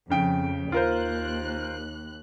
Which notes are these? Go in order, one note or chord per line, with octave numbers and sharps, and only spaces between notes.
F2 C#3 G5 D7
D#2 F4 A#4 C5 F#6